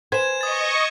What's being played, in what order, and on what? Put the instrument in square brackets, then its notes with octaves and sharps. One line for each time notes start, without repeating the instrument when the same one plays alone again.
[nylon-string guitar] B4 C5 G#5 [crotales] G#6 E7
[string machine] D#5 C#6 [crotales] D#6 A6